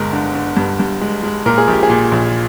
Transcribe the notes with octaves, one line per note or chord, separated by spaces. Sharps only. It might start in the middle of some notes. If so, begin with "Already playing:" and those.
Already playing: G1 G#3 A#4
D3
D3
G2
G2
G#3
G#3
A#2 A#4
G#4
A#1 G4
G#4
A#2
A#1